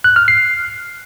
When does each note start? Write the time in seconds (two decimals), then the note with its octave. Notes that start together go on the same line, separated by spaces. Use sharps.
0.04 F#6
0.16 F6
0.28 C7